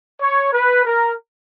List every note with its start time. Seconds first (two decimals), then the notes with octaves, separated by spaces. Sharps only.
0.21 C#5
0.53 B4
0.85 A#4